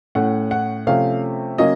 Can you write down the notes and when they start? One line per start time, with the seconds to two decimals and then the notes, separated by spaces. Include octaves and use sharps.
0.15 A2 A3 C#4 F#5
0.51 F#5
0.87 C3 F3 A3 C#4 F5
1.58 C#3 F#3 A#3 C#4 D#5